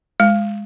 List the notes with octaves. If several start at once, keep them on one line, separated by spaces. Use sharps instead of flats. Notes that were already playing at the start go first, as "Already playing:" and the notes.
G#3